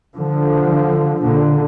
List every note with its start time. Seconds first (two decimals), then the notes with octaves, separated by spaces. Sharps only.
0.16 D3 F3
1.20 A#2 D3